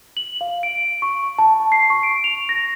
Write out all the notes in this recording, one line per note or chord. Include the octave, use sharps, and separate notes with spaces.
F#7
F5
D7
C#6
A5
C7
C#6
D7
F7
A#6